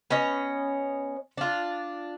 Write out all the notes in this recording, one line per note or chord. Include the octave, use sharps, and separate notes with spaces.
B3 C#4 C#5 D#5
D4 F4